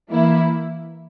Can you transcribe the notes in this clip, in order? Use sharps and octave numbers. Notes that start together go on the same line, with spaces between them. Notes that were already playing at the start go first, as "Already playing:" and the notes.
E3 A#3 E4